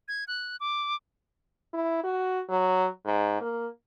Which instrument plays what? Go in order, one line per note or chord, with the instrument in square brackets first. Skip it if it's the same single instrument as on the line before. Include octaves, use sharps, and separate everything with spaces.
[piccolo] G#6
F#6
D6
[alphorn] E4
F#4
F#3
G#2
A#3